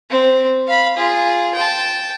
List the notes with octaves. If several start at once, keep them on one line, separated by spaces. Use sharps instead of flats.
C4
F5 B5
F4 G#4
G5 A5